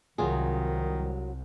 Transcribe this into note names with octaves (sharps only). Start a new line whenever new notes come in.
C2 D#3 F#3 F4 G#4